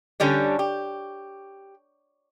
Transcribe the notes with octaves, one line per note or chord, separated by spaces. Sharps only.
D3 G3 C#4 D4
G4